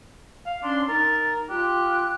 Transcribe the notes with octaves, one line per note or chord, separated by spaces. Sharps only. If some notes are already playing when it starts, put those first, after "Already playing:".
F5
C#4 D4 C6
D#4 A#4 A6
F4 G4 F#6